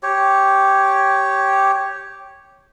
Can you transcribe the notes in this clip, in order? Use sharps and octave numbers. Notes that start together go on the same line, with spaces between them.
G4 C#5